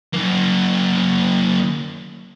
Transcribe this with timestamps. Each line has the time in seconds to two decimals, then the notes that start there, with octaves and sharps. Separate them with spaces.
0.13 F#2 A#3